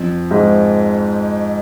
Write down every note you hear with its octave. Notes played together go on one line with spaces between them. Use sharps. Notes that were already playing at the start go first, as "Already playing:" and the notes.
Already playing: F2
G#2